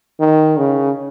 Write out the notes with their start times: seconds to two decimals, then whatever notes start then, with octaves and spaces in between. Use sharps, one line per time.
0.20 D#3
0.57 C#3